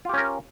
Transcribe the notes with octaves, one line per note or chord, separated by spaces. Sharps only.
C#4 F4 G4 A#4